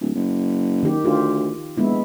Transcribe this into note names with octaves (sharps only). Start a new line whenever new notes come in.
D1
F#1
D#3 G4
D2 F4 G4
A#1 G#3 B3 E4